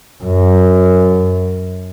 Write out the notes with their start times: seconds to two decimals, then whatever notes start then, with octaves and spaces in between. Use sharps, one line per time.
0.24 F#2